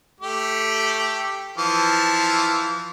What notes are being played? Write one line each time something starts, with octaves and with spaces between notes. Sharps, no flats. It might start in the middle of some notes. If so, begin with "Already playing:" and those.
A3 G4
E3 F3 A5